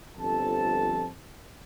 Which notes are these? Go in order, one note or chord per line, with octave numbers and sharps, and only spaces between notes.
G1 F2 F3 A4 A5